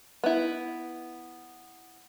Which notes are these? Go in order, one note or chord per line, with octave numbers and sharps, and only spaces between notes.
B3 E4